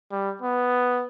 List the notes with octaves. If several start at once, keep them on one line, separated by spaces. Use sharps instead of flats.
G3
B3